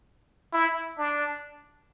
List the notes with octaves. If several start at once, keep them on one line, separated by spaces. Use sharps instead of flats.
E4
D4